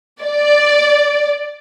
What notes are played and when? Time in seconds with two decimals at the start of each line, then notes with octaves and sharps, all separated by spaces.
0.22 D5